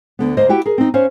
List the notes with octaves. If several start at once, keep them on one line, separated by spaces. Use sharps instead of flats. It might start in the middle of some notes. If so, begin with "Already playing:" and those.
D2 D3 B3
D2 A#3 C5 D#5
E4 F#4 G4 G5
G#4 A#4
C4 D#4
C#4 C5 C#5 F5